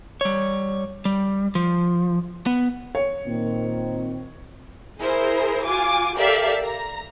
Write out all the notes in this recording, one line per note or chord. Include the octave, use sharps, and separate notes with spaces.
G3 C#5
G3
F3
B3
C#5
A#2 D#3 C4
E4 G#4 A#4 C5
F4 F#4 G#5 D6
G4 A4 A#4 D5 E5 F5
A#5